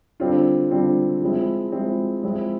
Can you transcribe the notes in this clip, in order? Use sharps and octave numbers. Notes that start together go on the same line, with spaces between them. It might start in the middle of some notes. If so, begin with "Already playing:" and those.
D3 G3 C4 F4
D3 G3 C4 F4
F3 G#3 C4 E4
F3 G#3 C4 E4
F3 G#3 C4 E4